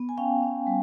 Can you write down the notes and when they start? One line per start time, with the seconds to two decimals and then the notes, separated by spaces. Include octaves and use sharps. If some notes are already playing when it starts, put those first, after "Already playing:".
Already playing: B3
0.09 G#5
0.17 C#4 F5 G5
0.42 C#4
0.67 G3